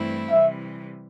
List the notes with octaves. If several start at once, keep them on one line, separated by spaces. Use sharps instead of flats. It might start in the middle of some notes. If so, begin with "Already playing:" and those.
Already playing: G2 E3 A3 C4 E4
C3 E3 G3 E5